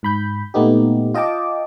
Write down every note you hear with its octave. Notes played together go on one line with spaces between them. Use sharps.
G#2 B5 G6
A#2 A3 B3 D#4 G4
F4 D#5 G5 A5 D6